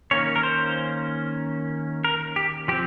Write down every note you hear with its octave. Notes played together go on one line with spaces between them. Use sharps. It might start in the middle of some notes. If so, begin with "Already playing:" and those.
D#3 A#3 C#4 C#5
A#4
C5
A#4
G4
F3 C4 G4